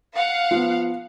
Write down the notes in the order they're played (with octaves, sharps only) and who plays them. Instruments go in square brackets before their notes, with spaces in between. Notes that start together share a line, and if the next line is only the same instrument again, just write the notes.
[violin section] F5 F#5
[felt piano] F3 B3